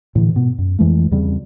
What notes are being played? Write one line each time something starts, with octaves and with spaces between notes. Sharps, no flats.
A2 D3 E3
G#2 B2 B3
F#2
F2 E3 G#3 A3
E2 C#3 G3 C4